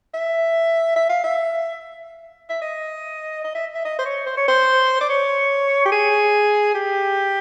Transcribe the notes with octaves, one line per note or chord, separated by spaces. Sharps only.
E5
E5
F5
E5
E5
D#5
D#5
E5
E5
D#5
C5
C#5
C5
C#5
C5
D5
C#5
G4
G#4
G4